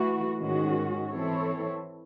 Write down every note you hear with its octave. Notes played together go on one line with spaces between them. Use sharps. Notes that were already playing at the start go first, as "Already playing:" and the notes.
Already playing: E3 A3 F#4
G#2 D#3 G#3 C#4 F#4
E3 C4 E4 A4 C#5